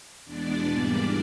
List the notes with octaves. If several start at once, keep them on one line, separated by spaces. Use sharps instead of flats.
E2 B2 G#3 B3 D4 D5
G#2 E3 G3 A#3